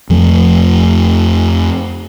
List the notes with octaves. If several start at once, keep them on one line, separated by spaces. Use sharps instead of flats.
F2 F3 A3